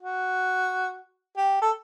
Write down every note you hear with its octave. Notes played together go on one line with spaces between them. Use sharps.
F#4
G4
A4